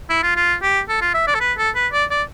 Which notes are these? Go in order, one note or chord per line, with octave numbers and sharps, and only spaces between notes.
E4
F4
F4
G4
A4
F4
E5
D5
A4
B4
A4
B4
D5
D5